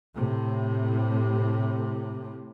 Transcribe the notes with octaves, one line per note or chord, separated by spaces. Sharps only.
A2 C3